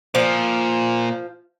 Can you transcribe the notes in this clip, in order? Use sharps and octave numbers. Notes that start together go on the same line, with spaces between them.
A#2 F3